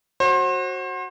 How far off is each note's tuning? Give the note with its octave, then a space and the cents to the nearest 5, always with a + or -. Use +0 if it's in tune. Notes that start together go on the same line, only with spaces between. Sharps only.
F#4 +0 C5 +35